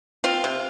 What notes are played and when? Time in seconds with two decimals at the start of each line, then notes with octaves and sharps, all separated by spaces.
0.24 C4 F4
0.44 C3